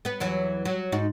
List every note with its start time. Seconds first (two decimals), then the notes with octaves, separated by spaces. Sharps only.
0.05 B3 B4
0.20 E2 E3 F#3
0.65 F#3
0.92 G#2 D#4 F#4